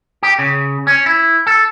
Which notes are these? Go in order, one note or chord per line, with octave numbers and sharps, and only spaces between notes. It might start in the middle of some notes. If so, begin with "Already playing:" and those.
G4
C#3
C#4
E4
A4